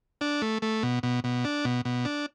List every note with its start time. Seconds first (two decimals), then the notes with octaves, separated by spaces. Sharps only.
0.21 D4
0.42 A3
0.62 A3
0.83 B2
1.03 B2
1.24 B2
1.45 D4
1.65 B2
1.85 B2
2.05 D4